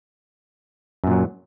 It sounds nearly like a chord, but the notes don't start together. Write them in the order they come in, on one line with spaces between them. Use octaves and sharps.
F#2 A#2 F#3